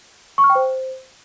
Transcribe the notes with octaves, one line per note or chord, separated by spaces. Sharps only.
C#6
F6
G5
C5